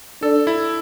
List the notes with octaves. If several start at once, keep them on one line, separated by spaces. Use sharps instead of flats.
D4 A4
E4